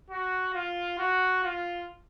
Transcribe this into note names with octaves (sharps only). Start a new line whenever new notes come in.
F#4
F4
F#4
F4